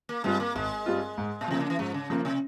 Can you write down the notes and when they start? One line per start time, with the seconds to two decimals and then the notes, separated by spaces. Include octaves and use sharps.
0.09 A#3
0.24 G2 G3 G#3 C4 F4
0.40 A#3
0.55 G#1 G#3
0.86 G2 G3 C4 F4
1.18 G#2
1.41 A#2
1.48 C3 F3 A#3
1.60 C#3
1.70 E3
1.79 G#2 F3
1.94 C#3
2.10 C3 F3 A#3
2.25 C3